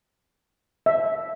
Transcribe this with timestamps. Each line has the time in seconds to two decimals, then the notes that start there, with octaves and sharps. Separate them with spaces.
0.86 E5